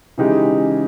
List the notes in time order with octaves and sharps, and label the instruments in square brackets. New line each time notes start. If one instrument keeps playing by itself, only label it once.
[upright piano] C#3 E3 G#3 D#4 G4